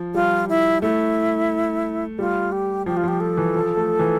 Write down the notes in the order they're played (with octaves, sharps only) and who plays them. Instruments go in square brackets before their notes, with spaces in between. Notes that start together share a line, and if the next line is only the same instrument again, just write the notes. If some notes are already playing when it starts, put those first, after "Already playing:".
Already playing: [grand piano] F3
[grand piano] G3 [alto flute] F4
[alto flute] E4
[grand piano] A3 [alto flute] E4
[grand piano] G3 [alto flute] F4
[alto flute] G4
[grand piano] F3 [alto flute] G4
[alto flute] F4
[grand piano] F3 [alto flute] G4
[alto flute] A4
[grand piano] E3
F3
A3
E3